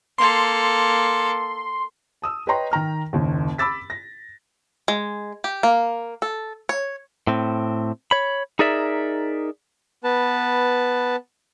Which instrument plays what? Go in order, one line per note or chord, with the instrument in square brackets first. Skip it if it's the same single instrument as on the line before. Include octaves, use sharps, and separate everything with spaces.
[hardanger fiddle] A#3 A4 [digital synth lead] C6
[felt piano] A5 D#6 E6
B4 C#5 D#5 G5 A#5 C6
D#3 G5 A#5 F6
F#1 D#2
B5 D6 E6 A6 B6
A#6
[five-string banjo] G#3
G4
A#3
A4
C#5
[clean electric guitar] A2 C4
C#5 B5
D#4 G#4 A#4 D5 E5
[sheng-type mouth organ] B3 B4 A5